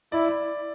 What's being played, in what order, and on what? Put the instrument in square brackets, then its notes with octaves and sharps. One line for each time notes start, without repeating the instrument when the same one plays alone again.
[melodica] E4 [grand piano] D5